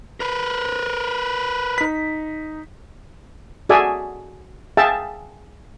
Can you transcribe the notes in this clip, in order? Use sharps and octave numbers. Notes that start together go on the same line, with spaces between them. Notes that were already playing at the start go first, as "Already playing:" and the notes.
A#4 B4
D#4 B6
F#4 G#4 A4 D5 E5 G#5
G#4 E5 F5 G5 A5